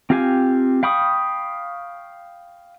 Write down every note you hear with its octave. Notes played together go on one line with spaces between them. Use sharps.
C4 F4 G4 F5 G#5
F5 G5 B5 C#6 D#6